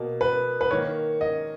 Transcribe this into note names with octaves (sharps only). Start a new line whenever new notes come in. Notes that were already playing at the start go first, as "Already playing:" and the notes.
Already playing: B2 A#3
B4
B4
D#3 A#3 C#5
D#5